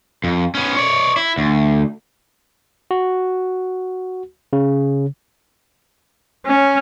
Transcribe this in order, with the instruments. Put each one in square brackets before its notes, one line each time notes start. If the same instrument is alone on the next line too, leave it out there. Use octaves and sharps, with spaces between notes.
[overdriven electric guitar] F2
B3 C#4
C#5 D5
E4
D2
[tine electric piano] F#4
C#3
[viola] C#4